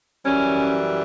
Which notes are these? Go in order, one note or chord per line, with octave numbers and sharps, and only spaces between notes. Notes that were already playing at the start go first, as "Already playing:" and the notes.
F#2 E3 G3 C#4